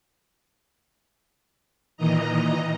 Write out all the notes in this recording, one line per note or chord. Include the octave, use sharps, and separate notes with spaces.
A#2 D#3 E3 D#5 A#5